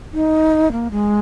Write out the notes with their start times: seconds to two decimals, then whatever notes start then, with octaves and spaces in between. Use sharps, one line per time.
0.13 D#4
0.72 A#3
0.91 G#3